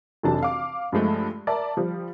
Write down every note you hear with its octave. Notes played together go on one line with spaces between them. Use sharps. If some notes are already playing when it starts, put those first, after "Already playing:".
F1 E3 F#3 D4 G4 A5
F5 D6
G2 F3 G#3 A3
A#4 D5 E5 A5
F3 G3